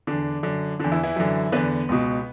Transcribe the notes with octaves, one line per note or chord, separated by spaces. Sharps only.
E2 D3 D4
F#2 D3
E2 D3 D4
E3 E4
E3 E4
F#2 D3
E2 D3 B3 B4
C#2 B2